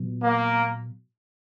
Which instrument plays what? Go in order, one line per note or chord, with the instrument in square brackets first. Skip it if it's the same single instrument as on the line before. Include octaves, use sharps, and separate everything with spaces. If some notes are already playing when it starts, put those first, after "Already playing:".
Already playing: [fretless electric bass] A#2 F#3 B3
[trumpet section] A#3